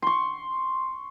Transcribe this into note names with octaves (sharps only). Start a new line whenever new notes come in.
C6 C#6